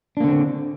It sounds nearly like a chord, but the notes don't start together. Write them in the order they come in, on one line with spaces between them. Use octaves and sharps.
D4 A#3 D3 C4